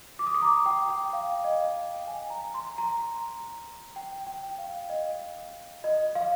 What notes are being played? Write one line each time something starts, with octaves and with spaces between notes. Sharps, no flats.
D6
D#6
D6
A#5
G5
G5
F5
D#5
G5
G#5
A#5
C6
A#5
G5
G5
F5
D#5
D#5
F5